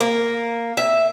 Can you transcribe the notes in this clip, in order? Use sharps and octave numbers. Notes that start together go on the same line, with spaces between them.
A#3
E5